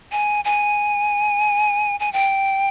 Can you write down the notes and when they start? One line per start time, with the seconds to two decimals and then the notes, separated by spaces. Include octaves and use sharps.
0.12 G#5
0.45 G#5
2.00 G#5
2.13 G5